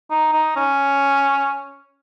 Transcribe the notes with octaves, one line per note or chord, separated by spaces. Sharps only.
D#4
D#4
C#4